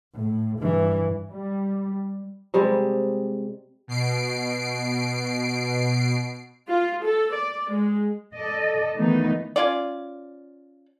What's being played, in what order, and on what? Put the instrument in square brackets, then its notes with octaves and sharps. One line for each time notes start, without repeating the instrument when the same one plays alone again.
[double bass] A2
G2 E3
[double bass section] G3
[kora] C3 G3 G#3
[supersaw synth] B2 C7 D7
[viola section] F4
A4
D5
G#3
[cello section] A4 D5 D#5
D#3 E3 A3 B3 D#4
[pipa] C#4 F4 D5